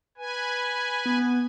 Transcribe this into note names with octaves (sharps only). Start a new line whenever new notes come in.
B4 G#5
B3